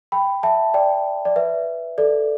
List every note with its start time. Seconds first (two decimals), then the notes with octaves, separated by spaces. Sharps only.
0.12 G5 B5
0.43 E5 A5
0.74 D5 G5
1.25 D5
1.36 B4 E5
1.98 A4 D5